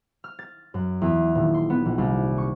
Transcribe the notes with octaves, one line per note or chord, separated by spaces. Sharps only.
F6
A6
F#2
E2
D#1
C6
B3
A#1
C2
C#6